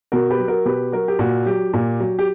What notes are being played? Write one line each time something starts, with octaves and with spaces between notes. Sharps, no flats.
B2 F#4 A#4
G4 B4
F#3
F#4 A#4
B2 G4 B4
F#3 F#4 A#4
G4
A#2 F#4
F#3 G4
A#2
F#3
G4